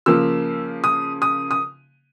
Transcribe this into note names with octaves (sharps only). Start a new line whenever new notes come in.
C#3 F3 A#3 E6
D#6
D#6
D#6